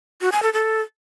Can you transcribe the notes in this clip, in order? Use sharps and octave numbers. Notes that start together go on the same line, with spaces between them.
F#4
G#5
A4
A4